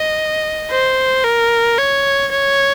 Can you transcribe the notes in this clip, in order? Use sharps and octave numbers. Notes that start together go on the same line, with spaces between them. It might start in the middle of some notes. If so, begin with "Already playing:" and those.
Already playing: D#5
C5
A#4
C#5
C#5